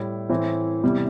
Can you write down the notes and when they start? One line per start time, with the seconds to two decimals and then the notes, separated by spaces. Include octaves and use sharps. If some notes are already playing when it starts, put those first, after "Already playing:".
Already playing: A2 G3 E4
0.29 A2 E3 C4 E4
0.83 E2 C3 G3 E4